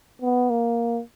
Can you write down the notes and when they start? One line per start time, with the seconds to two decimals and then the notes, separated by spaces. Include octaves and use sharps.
0.22 B3
0.50 A#3